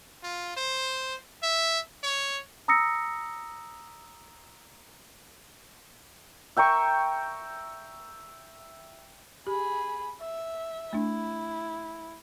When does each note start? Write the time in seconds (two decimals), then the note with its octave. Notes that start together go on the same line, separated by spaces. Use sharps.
0.23 F4
0.57 C5
1.42 E5
2.04 C#5
2.68 A#5 D#6 E6 A#6 C#7
6.57 E5 G5 A#5 C#6
9.47 G4 G#4 B5
10.20 E5
10.93 A3 D4 E4